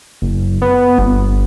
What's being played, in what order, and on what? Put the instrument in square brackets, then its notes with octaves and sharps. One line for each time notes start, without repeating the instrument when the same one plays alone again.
[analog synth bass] F#1
B3
G1